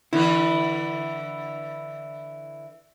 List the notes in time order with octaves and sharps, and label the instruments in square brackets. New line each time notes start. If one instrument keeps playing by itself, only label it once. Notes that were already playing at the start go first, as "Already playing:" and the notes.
[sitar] D3 E3 B4 [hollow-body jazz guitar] E4